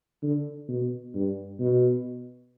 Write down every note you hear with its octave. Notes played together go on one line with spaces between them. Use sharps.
D3
B2
G2
B2